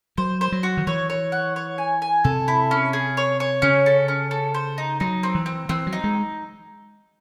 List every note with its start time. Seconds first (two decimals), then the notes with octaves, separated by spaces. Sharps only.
0.18 F#3 C5
0.41 C5
0.52 F#3
0.63 F#4
0.77 D#3
0.87 E3 C#5
1.10 C#5
1.32 F#5
1.56 C#5
1.78 G#5
2.02 G#5
2.24 C3 A4
2.48 E4
2.71 C#4
2.93 G#4
3.17 C#5
3.40 C#5
3.62 C#3 C#4
3.86 A4
4.08 C#4
4.31 A4
4.54 C5
4.78 D#4
5.00 F#3 D#4
5.23 C4
5.35 E3
5.46 C4
5.69 E3 C4
5.87 F#3
5.93 D#4
6.04 G#3